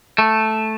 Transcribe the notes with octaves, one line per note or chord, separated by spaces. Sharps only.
A3